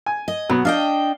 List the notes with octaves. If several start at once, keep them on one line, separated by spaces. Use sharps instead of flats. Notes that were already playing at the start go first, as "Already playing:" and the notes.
G#5
D#5
B2 F#3 B3
D4 D#5 F5 G5